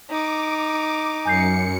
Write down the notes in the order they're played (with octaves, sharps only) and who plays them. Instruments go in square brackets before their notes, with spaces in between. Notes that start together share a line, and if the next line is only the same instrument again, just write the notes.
[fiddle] D#4 [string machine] D6
[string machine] F#2 C#7 [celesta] G#5 G6 C7